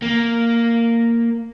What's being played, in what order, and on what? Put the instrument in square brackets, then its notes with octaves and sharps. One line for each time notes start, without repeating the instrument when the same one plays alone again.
[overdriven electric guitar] A#3